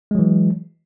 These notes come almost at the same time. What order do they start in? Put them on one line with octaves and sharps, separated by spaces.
G#3 F#3 E3